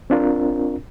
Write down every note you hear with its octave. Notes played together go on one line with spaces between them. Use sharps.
C4 D4 F4 A#4